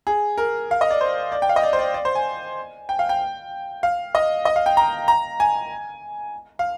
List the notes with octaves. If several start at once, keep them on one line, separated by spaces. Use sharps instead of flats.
G#4
A#4
F5
D#5
D5
C5
D5
G5
F5
D#5
D5
C5
D5
D5
C5
G#5
G5
F5
G5
F5
D#5
D#5
F5
G5
A#5
A#5
G#5
F5